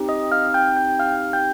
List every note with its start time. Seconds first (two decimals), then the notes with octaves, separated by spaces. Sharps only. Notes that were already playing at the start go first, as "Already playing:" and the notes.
Already playing: C4 D#4 G4
0.09 D#5 D#6
0.32 F5 F6
0.54 G5 G6
0.77 G5 G6
0.99 F5 F6
1.33 G5 G6